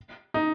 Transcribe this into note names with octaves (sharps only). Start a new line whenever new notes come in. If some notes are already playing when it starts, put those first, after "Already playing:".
D#4